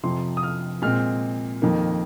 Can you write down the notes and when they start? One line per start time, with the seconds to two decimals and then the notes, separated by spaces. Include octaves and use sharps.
0.03 F2 C3 F3 C6
0.37 D#6
0.43 F6
0.82 A#2 G#3 C4 F6
1.62 F2 D#3 A#3